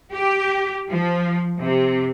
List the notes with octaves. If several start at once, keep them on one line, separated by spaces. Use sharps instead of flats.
G4
F3
C3